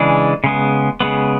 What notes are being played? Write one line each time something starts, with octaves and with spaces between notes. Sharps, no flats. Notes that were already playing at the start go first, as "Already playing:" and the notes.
Already playing: C#3 E3 G#3 D4
C#3 G#3 B3
C#3 G#3 B3